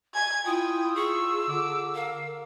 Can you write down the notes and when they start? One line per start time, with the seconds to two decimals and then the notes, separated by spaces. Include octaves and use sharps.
0.14 G#5 G#6
0.46 E4 F4 G5 D#6
0.95 G#4 C#6 E6
1.48 D3 D6
1.95 A#4 F5